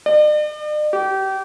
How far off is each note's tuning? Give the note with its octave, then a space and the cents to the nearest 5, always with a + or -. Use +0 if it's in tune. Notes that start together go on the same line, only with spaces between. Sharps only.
D5 +45
G4 -30